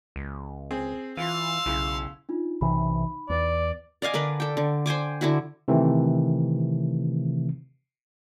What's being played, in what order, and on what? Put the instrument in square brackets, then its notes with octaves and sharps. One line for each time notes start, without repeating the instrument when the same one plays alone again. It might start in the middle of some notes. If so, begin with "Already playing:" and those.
[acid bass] C#2
[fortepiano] C4 G#4
[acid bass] E3 [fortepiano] F4 [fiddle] F5 C6 [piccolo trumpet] E6
[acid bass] B1 [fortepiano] C#3 E4
[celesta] D4 D#4 F4
[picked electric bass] B1 C3 E3 [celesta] D#4 B5
[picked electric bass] E2 [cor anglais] D5
[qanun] D5 D#5 F5 G#5
D3 D4 A#4 B4
A4 G5
D3
C5 G5 G#5 D6
D3 E4 F#4
[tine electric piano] C3 D#3 E3 A3 C4